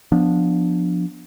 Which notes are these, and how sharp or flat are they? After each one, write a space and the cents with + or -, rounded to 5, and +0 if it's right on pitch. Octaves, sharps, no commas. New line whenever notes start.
F3 +15 B3 +0 D4 +0